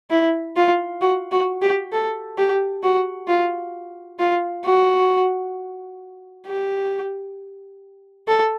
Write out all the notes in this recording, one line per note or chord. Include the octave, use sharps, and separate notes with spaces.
E4
F4
F#4
F#4
G4
A4
G4
F#4
F4
F4
F#4
G4
A4